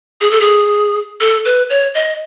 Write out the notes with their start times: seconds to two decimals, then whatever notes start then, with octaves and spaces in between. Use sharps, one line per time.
0.21 G#4
0.31 A4
0.41 G#4
1.21 A4
1.45 B4
1.70 C#5
1.95 D#5